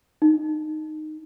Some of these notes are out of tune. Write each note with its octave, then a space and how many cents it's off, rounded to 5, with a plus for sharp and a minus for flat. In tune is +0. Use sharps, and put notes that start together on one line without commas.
D#4 -10